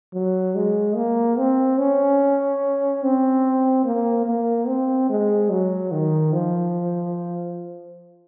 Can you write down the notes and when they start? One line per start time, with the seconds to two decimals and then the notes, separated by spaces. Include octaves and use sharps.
0.14 F#3
0.55 G#3
0.96 A#3
1.38 C4
1.78 C#4
3.03 C4
3.85 A#3
4.26 A#3
4.67 C4
5.09 G#3
5.50 F#3
5.92 D#3
6.33 F3